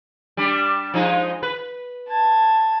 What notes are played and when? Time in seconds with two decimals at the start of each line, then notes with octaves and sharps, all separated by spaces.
0.37 G3 D4
0.94 F3 G#3 D#4
1.43 B4
2.08 A5 G#6